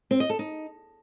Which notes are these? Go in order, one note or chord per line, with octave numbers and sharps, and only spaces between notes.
C4
D#5
A4
D#4